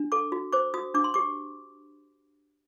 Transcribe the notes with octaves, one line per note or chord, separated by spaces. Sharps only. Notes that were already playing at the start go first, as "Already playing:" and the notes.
Already playing: D4
A4 D6
F#4
C5 D6
F#4 D#6
D4 D6
C6
G4 D6